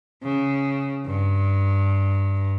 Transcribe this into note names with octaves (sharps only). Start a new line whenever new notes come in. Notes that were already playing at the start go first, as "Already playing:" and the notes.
C#3
G2